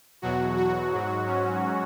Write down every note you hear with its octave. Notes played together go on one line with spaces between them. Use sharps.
E2 B2 F#3 F#4
F#4
G#2 F#3
C#4